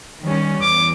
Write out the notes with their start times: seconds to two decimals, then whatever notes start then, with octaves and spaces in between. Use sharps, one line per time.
0.22 D#3 G3 C#4
0.61 E2 D6